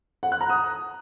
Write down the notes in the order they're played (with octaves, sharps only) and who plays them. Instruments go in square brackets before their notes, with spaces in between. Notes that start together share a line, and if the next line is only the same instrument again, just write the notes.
[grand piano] F#5
F#6
A#5
D#6